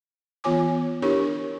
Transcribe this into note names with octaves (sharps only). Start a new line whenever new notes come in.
E3 B3 F4 C#5 G#5 D6
D4 E4 G4 A#4 C#5 C#6